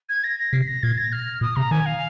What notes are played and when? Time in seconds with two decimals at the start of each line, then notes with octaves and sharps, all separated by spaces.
0.09 G#6
0.24 A#6
0.39 A#6
0.53 C3 C7
0.67 A#6
0.83 A#2 G#6
0.98 A#6
1.12 F6
1.41 A#2 D#6
1.56 C3 A#5
1.71 D#3 G#5
1.86 F5